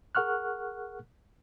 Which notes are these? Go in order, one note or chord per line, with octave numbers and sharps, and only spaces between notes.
G#4 A#4 F#5 C#6 F6 F#6